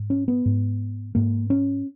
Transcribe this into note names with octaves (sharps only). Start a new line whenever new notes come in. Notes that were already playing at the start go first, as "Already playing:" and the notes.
Already playing: G#2
C#4
B3
G#2
G#2 A#3
C#4